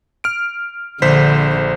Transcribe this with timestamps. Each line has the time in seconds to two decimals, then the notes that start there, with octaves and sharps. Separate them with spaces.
0.24 F6 D7
1.02 A#1 D3 C5 B6